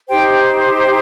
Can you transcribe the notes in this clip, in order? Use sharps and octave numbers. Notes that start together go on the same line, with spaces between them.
D#4 G4 C5 G5